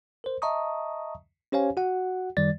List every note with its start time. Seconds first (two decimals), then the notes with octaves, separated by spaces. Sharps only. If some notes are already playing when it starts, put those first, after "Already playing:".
0.24 A#4 C5
0.42 D#5 E5 A5 A#5 C#6 D#6
1.52 C#4 G4 C5 C#5 F5 G#5
1.77 F#4 F#5
2.37 F#2 D#3 G3 D5 A6